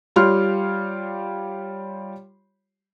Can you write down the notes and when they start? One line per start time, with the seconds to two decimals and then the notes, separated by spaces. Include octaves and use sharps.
0.16 G3 F4 G4 C#5 C6 F6